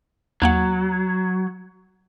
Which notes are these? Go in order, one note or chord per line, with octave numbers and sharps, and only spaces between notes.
D#2 F#3 A#3 F#5